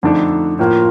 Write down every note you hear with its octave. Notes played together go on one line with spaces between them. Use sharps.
F2 D3 A3 D4 D#4 A4
A2 F3 A#3 F4